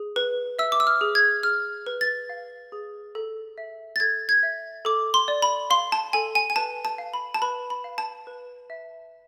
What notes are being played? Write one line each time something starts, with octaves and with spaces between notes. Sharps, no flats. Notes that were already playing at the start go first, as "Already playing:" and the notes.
Already playing: G#4
B4
E5 E6
D6
E6
F6
G#4
G#6
G#4 F6
B4
A6
F5
G#4
A4
E5
A6
A4 G#6
G#6
E5
A4 D6
C6
D5
B5
F5 C6
A5
A4 G#5
G#5
G#5
B4 A5
A5
F5
B5
A5
B4 B5
B5
F5
A5
B4
E5